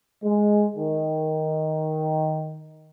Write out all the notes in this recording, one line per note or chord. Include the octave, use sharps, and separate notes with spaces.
G#3
D#3